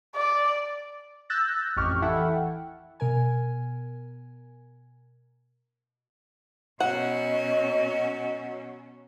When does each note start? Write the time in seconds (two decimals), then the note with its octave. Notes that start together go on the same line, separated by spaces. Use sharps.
0.16 D5
1.30 E6 F#6 G6 A6 A#6
1.76 A1 F2 G4 D#5 C#6 F6
2.02 E3 E4 A4 E5 F#5 G5
3.00 B2 A#4 G#5
6.80 B2 F#3 C#4 D#5 F#5